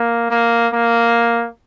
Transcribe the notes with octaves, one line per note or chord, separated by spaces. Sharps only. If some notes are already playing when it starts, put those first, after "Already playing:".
Already playing: A#3
A#3
A#3